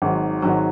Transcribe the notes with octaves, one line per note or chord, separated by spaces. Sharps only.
G#1 G#2 F#3
G#1 G#2 F#3